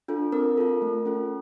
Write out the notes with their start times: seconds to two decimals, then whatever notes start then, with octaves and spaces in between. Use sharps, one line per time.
0.08 D4 F4 A4
0.32 C4 A#4
0.57 F4 A4
0.82 A3
1.06 C#4 F4 A4